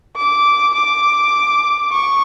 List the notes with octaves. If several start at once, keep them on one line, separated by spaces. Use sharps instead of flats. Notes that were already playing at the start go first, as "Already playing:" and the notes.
D6
D6
C#6